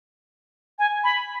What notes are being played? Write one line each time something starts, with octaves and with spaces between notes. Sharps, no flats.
G#5
B5